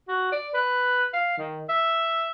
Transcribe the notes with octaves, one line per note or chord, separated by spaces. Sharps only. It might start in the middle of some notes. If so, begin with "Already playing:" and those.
F#4
D5
B4
F5
D#3
E5